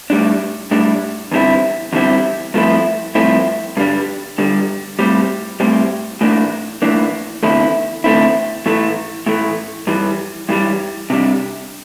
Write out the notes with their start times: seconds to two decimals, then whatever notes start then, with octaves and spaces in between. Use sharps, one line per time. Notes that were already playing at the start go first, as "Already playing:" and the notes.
0.10 A2 G3 D4
0.71 A2 G3 D4
1.32 E2 D3 G3 C4 E4
1.93 E2 D3 G3 C4 E4
2.54 G2 F3 A3 C4 E4
3.15 G2 F3 A3 C4 E4
3.77 G2 D3 G3 D4
4.38 G2 D3 G3 D4
4.99 A2 G3 C4
5.60 A2 G3 C4
6.21 A2 E3 A#3 D4
6.82 A2 E3 A#3 D4
7.43 E2 D3 A3 C4 E4
8.04 E2 D3 A3 C4 E4
8.66 A2 E3 A3
9.26 A2 E3 A3
9.87 G2 E3 G3
10.49 G2 E3 G3
11.10 C3 G3 D4